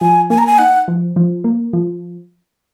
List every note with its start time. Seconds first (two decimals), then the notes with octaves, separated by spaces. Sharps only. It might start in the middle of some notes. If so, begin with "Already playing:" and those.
0.01 F3 G#5
0.30 A#3 G#5
0.38 A#5
0.47 G#5
0.58 D#4 F#5
0.88 F3
1.16 F3
1.44 A#3
1.73 F3